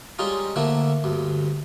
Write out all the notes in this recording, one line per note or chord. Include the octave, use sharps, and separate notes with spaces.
G3 G#3 C#4 D#4 F4
D3 F3 A3 A#3 E4
D2 G2